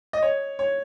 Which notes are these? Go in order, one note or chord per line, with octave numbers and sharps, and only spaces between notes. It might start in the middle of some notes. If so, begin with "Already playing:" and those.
D#5
C#5
C#5